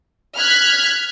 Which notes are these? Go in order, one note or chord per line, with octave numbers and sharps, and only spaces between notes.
F6 F#6 G#6 B6